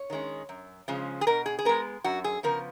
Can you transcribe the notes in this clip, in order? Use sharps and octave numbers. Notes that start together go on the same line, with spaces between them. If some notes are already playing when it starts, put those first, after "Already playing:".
Already playing: C#5
D#3 G#3 C#4
F#2
C#3 F3 G#3 C#4
G#4
B2 A#4
G#4
G#4
G#3 B3 A#4
F#2 F#4
G#4
C#3 F3 B3 A#4